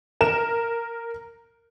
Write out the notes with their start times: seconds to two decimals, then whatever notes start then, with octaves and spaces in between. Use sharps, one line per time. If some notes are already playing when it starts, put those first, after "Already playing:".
0.21 A#4 E7